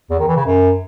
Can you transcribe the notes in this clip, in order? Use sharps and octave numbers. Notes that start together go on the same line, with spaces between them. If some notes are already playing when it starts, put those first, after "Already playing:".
E2
D#3
E3
C#3
F#2